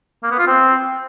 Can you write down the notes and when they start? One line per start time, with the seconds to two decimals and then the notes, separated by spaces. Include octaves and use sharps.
0.23 A#3
0.31 B3
0.39 F4
0.47 C4